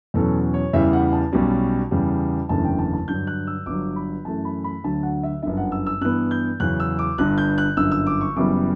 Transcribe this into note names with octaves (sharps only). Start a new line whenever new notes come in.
E2 B2 F#3 C#4 A4
C#5
E2 C#3 E3 G3 E5
F#5
A5
B1 B2 G3 C#4
E2 C#3 G3
F#1 E2 D3 A3 C#4 A5
G5
A5
A5
G2 D3 F#3 G6
F#6
E6
G1 G2 F#3 D6
B5
F#2 E3 A3 C#4 A5
B5
B5
D2 D3 F#3 A5
F#5
E5
G1 F#2 D3 E5
F#5
E6
E6
G2 E3 B3 F#6
G6
E2 C#3 F#3 C#4 F#6
E6
D6
G1 G2 D3 F#6
G6
F#6
G1 F#2 D3 E6
E6
D6
C#6
F#1 F#2 E3 G3 B3 D6